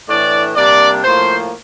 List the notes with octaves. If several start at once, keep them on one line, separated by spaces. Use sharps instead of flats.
A2 E3 A3 D4 D5
C3 G3 A#3 D4 D5
A2 F3 A#3 C5